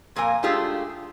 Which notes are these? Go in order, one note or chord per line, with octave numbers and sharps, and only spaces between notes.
F2 A#2 A#3 A#4 G#5
G#3 A3 D4 F4 G4 G#4